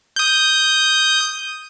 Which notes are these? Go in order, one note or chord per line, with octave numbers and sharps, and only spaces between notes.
D#6 G6